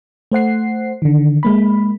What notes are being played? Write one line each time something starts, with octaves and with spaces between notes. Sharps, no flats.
A3 C5 F#5 C7
D3 D#3
G#3 A#3 B5